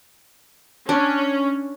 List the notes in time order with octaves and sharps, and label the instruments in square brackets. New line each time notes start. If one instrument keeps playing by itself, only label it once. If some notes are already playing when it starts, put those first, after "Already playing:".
[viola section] C#4 [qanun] D4